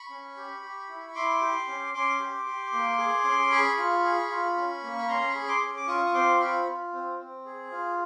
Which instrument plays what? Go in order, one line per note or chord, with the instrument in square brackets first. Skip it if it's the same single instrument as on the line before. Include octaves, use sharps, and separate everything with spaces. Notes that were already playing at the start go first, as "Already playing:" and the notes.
Already playing: [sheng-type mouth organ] B5 C#6
C#4
G4
G4
E4
E4 C6 D6
G4
C#4
C#4 C6 D6
G4
G4
A#3
G#4
C#4
G#4 B5 C#6
F4
G#4
F4
C#4
A#3
B5
C#4 A#5 C6
B5 C#6
G#4
C6 D6
C#4
D6
F4 C#6 D#6
D#6
C4 C6 D6
F4 B5 C#6
F4
C4
C4
G#4
F4